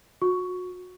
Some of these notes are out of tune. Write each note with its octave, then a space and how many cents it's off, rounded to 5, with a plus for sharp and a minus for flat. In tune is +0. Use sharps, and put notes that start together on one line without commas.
F#4 -30 C#6 +10